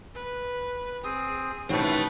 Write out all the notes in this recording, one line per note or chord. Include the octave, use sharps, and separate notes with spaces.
B4
C4 G#4 D#6
A1 B2 D#3 A3 C4 B4 C#5